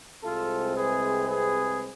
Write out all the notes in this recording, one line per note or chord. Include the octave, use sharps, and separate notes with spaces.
C2 C3 G#3 C4 F4 A4
G#4 B4
G#4 B4